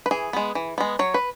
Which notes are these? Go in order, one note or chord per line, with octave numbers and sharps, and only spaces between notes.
B4
E3 G#4
G#3 B3
E3
G#3 B3
F#3 C#5
B4